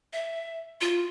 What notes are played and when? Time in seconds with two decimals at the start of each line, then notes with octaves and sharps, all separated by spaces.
0.13 E5
0.81 F4